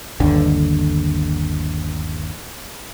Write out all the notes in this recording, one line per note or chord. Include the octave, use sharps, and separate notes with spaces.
G1 D#2 D3